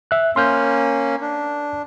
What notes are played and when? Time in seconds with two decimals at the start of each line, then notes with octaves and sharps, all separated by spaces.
0.11 E5 F#6
0.36 A#3 C#4 C6 F6 G6
1.21 D4